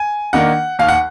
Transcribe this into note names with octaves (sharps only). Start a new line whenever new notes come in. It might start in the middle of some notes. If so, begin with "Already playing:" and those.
Already playing: G#5
D#3 A#3 D4 F#5
D#2 F5
F#5